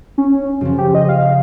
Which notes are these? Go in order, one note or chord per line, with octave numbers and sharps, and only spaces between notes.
C#4
F#2 C#3 F3
G4
D#5
F5